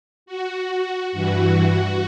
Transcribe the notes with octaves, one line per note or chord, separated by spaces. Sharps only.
F#4
G2 E3 F#4